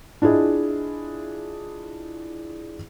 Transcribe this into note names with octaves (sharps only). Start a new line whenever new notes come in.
D4 E4 F4 G#4 D#5